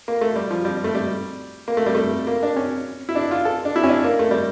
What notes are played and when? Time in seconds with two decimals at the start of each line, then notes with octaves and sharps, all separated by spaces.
0.08 A#3
0.21 A3
0.36 G3
0.51 F3
0.65 G3
0.84 A3
0.95 G3
1.68 A#3
1.77 A3
1.86 G3
1.95 A3
2.27 A#3
2.43 D4
2.56 C#4
3.09 E4
3.15 D4
3.31 F4
3.45 A4
3.65 D4
3.76 E4
3.83 C#4
3.89 D4
4.04 A#3
4.19 A3
4.31 G3